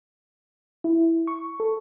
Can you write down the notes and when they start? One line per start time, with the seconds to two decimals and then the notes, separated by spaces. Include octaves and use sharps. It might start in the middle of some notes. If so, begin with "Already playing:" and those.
0.84 E4
1.27 C#6
1.60 A4